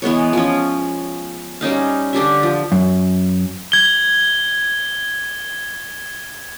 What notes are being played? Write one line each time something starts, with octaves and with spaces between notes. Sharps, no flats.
E3 G#3 B3 C#5
F3 C#4
G3 C#4 D#4 F5
D3 D4 G4 E5
F3
F#2
G#6 G7